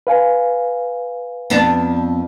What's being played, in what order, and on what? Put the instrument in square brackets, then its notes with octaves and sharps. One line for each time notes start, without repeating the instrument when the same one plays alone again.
[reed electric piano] B4 F5 G#5
[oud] F2 B3 D4